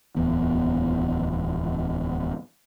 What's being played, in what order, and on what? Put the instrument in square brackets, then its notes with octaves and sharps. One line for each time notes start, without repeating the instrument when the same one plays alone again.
[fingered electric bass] D1 E2 B3